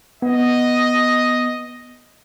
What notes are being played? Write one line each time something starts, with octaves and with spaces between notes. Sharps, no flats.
B3 D#5